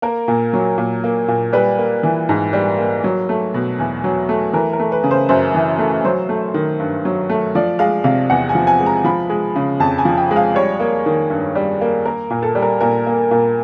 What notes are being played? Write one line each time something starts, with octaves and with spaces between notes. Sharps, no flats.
A#3 A#4
A#2
F#3
A#2
A#3
A#2
G3 B4
A#3
E3
G#2
G3
A#3
F#3
A3
B2
E2
F#3
A3
E3 A#4
A#4
A3
B4
C#3
C5
F#2 C5
E3
A3
F#3 C5
A3
D#3
G2
F#3
A3
F3 D5
G#3 F5
C3 F5
E2 F#5
G#5
F3
G#5
G#3
A#5
F3 B5
G#3
C#3
F2 A5
G#5
F3
G5
G#3
F5
G3 C#5
A#3
D#3
G2
G3
A#3
A#3 A#4
A#2
A4
G3
A#4
A#2 A#4
A#3
A#2